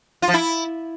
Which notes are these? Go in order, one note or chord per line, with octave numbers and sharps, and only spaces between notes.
F4
F3
E4